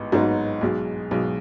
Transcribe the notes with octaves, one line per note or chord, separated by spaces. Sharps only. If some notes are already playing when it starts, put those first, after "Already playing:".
Already playing: A1 G#2 B3 D#4
A1 G#2 F#3 B3 D#4
B1 B2 G#3
B1 B2 G#3